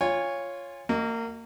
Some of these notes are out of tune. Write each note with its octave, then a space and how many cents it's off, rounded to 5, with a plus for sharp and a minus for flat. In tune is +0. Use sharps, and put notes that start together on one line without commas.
F4 +0 C#5 +0 G#5 -25
A#3 -25 F#4 +20 D#5 +0